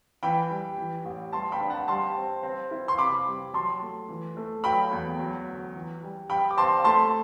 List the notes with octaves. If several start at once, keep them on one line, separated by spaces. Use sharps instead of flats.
E3 G5 B5
G3
E3
A1
G3 A5 C6
G5 B5
D4
F#5 A5
G3 A5 C6
C4
C4
E4
C6
C3 B5 D6
G3
F#3 A5 C6
A3
E3
A3
F#3 G5 B5
E2
F#3
D2
E3
G3
G3 G5 B5
D6
C4 A5 C6
A3 A5 C6